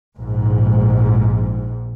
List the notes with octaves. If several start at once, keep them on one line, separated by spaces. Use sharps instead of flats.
A#1 G#2